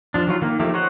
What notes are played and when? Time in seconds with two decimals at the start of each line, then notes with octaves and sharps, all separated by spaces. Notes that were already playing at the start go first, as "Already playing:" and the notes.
0.14 F3 D4
0.27 D#3 F#3 F4
0.42 D#3 A#3
0.59 D#3 F3 A3 A#3 G4
0.74 A#4 C5 C#5 D#5 F#5